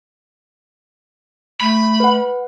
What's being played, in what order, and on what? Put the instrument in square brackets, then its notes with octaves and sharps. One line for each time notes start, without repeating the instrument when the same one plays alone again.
[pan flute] A3 [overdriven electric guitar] B5
[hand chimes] B4 F#5